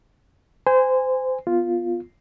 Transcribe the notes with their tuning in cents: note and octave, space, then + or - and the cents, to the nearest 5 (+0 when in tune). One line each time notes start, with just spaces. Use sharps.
C5 -25 G#5 -20
B3 -10 F4 +0